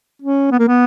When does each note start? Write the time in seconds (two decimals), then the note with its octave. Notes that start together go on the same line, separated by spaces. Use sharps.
0.22 C#4
0.51 B3
0.59 A#3
0.67 B3